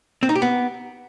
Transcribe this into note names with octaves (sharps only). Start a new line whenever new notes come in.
C4
D#4
G4
B3